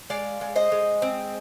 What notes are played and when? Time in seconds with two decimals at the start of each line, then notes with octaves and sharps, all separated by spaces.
0.10 G#3 D5 F5
0.41 G#3
0.56 C5 D#5
0.72 G#3
1.02 C4